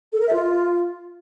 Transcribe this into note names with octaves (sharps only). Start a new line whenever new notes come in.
A4
A#4
E5
F4